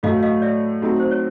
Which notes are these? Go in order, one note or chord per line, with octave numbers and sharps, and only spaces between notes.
A2 F#3 A3 D#5 F5
D#5 F5
D5 E5
F#3 A3 C4 D#4
C5
C#5